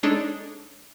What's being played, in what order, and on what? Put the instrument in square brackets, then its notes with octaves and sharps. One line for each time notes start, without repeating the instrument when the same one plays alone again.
[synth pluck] G#3 D4 D#4 A4 C#5